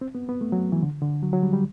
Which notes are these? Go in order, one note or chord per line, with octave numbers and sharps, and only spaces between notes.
C4
B3
B3
A3
F#3
E3
D3
D3
F#3
F#3
G3
G3